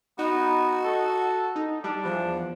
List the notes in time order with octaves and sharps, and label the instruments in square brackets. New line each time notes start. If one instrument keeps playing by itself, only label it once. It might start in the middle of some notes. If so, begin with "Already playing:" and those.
[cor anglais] B3 [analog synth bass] D#4 [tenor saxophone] F#4
[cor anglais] A4
[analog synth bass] D#4
[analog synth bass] G3 [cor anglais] D4
[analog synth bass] E2 [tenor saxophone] F3